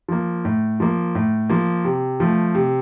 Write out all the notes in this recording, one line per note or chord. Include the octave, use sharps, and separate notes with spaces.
F3 A#3
A2
F3 A#3
A2
F3 A#3
C3
F3 A3
C3